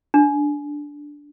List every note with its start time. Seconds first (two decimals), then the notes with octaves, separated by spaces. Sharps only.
0.14 D4